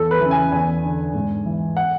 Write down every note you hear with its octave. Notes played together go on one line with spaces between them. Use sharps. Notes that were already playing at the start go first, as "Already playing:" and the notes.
Already playing: E2 A4
B4
C#3 E3
G#5
E2 G#5
D3
G#2
E3
F#5